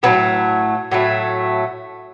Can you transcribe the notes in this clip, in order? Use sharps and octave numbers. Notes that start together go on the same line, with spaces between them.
A2 F#3 A3 B3
A2 F#3 A3